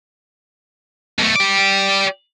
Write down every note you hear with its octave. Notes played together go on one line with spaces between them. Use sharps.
B1 A3
G4 D5